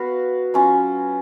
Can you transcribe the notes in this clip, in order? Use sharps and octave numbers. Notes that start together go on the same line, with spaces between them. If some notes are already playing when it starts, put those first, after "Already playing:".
Already playing: B3 F#4 B4 F5
F#3 C#4 F4